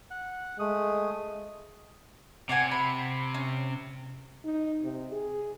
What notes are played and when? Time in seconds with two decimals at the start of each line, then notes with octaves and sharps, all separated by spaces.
0.11 F#5
0.59 G#3 A3 D#6
2.49 C3 D5 F#5 G#5
2.71 B5
3.34 C#4
4.45 D#4
4.83 C3
5.12 G#4